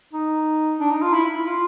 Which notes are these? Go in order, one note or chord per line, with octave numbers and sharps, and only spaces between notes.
D#4
D4
D#4
F4
E4
E4
F4